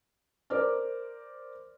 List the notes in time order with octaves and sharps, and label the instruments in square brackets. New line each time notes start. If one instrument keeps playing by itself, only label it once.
[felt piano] A#4 C5 D5 D6 F6